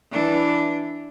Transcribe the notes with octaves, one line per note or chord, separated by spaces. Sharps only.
E3 D4